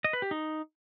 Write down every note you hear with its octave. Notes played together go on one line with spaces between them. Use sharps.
D#5
B4
G4
D#4